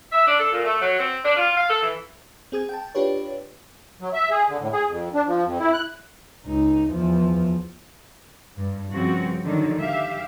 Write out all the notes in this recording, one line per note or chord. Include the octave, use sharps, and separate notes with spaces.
E5
D4
A4
A#2
A3
F#3
C4
D4
F4
F5
A4
E3
C4 G#4 D#6 G#6
G5 A5
D4 F4 G4 B4 C#5
F#3
E5
G#4
D3
A2
G#4
F2
D4
F3
F2
E4
F#6
C#2 D#4
E2 F3
G2
G2 C#3 F3 C4 F#4
D3 D#3 F3 F#3
G4 E5 F5